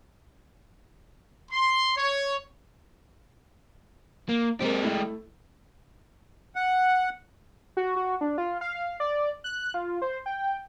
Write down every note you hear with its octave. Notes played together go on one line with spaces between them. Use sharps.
C6
C#5
A#3
G#3 C4 G4 A#4
A3 E4
F#5
F#4
F#4
D4
F4
F5
F5
D5
F#6
F4
C5
G5